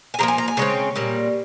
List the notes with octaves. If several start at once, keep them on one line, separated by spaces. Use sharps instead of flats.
G#5
C#3 F3 A#3 A#5
G#5
A#5
G#5
C#3 G#3 C4 C#5
A#2 G3 A#3